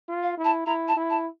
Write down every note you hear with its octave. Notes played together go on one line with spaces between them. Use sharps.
F4
F5
E4
A5
E4 A#5
A5
E4
A5